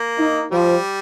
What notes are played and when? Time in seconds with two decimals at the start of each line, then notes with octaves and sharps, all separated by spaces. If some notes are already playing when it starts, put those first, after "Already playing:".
Already playing: A#3
0.18 D#4
0.51 F3 G3